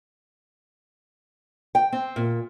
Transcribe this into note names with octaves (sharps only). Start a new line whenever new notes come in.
G5
C4
A#2